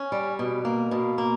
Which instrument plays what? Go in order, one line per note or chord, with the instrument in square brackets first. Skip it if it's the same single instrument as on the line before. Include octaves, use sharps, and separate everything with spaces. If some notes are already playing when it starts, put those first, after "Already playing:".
Already playing: [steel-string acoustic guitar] C#4
G3
B2
A#3
B2
A#3